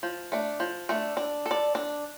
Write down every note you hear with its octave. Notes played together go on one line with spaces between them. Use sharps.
F3
A3 D4
F3
A3 D4
D4
A4
D5
D4